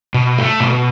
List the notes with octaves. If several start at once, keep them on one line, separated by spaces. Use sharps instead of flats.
B2
A3
B2